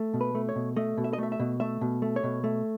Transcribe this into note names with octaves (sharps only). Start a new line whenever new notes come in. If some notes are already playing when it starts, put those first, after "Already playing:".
Already playing: A3
B2
B4
A3
C#5
B2
A3 D#5
B2
E5
D#5
A3 E5
E5
B2
A3 E5
B2
A3
C#5
B2
A3